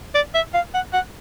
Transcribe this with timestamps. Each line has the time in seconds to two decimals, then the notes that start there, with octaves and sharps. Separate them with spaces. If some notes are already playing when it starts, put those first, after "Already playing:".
0.14 D5
0.34 E5
0.54 F5
0.74 F#5
0.93 F#5